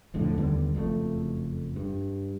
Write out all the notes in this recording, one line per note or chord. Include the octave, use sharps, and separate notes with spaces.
D#1 F2 A2 D3
D#2 D3 G3 B3
F#1 F2 D3 A3
G2